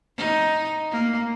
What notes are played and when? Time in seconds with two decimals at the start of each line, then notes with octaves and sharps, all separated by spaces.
0.17 D#4
0.91 A#3